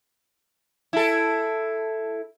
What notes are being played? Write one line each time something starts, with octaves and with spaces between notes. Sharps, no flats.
E4 A4